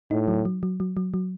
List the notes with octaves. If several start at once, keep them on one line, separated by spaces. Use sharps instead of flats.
A2 D#4
F#3
F#3
F#3
F#3
F#3
F#3